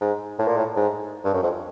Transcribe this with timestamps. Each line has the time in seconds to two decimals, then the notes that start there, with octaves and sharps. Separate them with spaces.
0.01 G#2
0.39 A2
0.47 A#2
0.57 A2
0.76 G#2
1.24 G2
1.34 F#2
1.43 F2